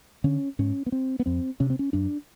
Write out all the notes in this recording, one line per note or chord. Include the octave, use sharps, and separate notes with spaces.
D3 C#4
G#2 C#4
B3
C4
B3
F2 C4
C3 C#4
C4
C#4
F#2 D4